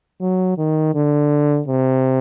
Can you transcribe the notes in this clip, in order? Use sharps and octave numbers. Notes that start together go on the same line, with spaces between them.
F#3
D#3
D3
C3